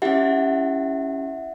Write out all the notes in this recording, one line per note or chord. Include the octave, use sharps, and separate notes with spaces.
C#4 E4 G4 E5 F#5